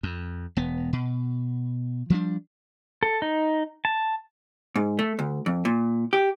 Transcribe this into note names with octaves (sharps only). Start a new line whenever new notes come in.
F2
E1 B3
B2
F3 G3 A3 D4
A4
D#4
A5
G#2
A3
D2
F2
A#2
G4